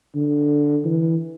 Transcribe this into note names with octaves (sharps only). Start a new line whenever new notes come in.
D3
E3